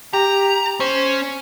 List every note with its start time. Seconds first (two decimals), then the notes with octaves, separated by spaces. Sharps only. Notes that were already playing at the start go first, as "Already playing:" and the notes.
0.13 G4 A#5
0.80 C#4 C5